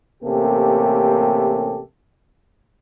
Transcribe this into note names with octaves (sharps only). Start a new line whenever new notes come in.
A1 C3 A#3 C#4 G4 A4